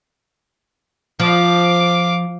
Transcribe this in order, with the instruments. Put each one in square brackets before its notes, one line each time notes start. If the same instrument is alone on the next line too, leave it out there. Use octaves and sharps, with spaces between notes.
[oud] F3 [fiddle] F5 D6